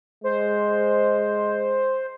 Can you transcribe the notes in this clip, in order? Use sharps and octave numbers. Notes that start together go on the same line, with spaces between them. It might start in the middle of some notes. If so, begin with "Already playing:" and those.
G#3 C5